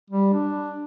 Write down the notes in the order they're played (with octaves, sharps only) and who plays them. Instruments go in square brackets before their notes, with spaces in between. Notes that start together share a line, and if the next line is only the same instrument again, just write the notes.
[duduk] G3
D4